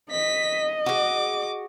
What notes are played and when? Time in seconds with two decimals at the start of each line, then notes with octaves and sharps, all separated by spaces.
0.11 D#5 B6
0.86 F#4 G#4 D6